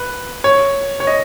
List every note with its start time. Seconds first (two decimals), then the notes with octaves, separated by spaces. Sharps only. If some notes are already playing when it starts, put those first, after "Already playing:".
Already playing: B4
0.44 C#5
1.00 C#5
1.07 D#5